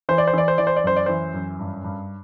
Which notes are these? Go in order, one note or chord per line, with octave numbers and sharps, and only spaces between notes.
E3 C5
D5
C5
E3 D5
C5
E3 D5
C5
D5
F#2 C5
D5
E3 C5
F#2
G2
G2